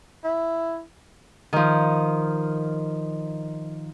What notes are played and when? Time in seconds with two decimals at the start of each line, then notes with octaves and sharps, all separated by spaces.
0.24 E4
1.53 D#3 F3